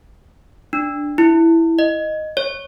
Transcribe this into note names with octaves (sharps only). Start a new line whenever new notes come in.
D4
E4
D#5
C#5